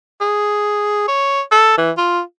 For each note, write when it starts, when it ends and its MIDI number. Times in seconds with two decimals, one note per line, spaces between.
0.21 1.04 68
1.08 1.42 73
1.52 1.74 69
1.78 1.91 52
1.98 2.21 65